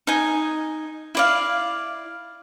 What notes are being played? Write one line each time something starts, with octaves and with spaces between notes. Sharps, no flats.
D#4 G#5
E4 D5 F5